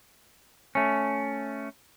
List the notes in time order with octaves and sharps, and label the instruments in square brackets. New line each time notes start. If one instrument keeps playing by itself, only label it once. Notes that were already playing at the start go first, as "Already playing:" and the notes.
[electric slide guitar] A3 C#4